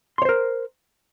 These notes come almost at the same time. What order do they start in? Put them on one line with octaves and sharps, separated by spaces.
C6 C#5 C5 A#4